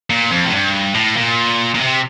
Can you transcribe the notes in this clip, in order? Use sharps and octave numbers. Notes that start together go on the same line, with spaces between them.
A#2
F2
A2
G2
A2
A#2
A#2
C3